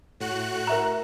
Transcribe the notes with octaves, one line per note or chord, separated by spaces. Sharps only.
A2 F#4 F#6
A#4 E5 A#5